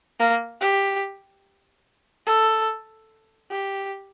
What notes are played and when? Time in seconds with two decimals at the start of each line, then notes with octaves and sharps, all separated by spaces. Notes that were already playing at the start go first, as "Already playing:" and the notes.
0.20 A#3
0.61 G4
2.26 A4
3.51 G4